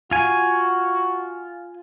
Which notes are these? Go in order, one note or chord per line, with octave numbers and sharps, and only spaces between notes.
F4 F#4 G#5